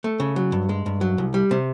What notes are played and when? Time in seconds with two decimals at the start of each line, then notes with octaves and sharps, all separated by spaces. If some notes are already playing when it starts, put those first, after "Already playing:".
0.04 A3
0.20 C#3
0.36 F#3
0.52 G2
0.69 G#3
0.86 G2
1.01 F#3
1.18 C2
1.34 G3
1.51 C3